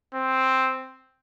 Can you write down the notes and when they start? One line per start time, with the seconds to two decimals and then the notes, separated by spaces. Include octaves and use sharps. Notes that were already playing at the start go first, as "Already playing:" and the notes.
0.14 C4